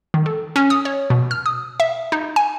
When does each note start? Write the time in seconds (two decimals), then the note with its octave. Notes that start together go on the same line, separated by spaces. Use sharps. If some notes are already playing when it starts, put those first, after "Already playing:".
0.14 D#3
0.26 A4
0.56 C#4
0.70 D#6
0.85 C#5
1.10 B2
1.31 F6
1.46 D#6
1.80 E5
2.12 D#4
2.36 G#5